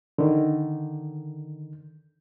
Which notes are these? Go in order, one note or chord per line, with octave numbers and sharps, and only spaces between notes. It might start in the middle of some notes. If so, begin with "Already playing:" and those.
D3 D#3